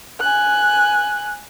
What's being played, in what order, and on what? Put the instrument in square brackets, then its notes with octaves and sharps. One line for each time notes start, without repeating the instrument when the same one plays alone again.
[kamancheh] G#5 F#6